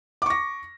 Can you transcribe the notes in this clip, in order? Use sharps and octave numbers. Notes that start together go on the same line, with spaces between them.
C#6 D6 A#6